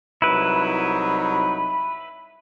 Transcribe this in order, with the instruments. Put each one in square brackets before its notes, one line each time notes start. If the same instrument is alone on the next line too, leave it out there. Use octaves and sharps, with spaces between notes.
[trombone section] C2 F#3 D#4 [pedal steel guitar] E4 B4